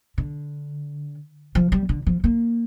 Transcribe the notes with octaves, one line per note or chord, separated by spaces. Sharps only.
D3
F3
G3
D3
F3
A#3